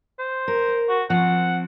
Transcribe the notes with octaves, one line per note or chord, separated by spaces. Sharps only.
C5
A#4
F#4
F3 C4 F#5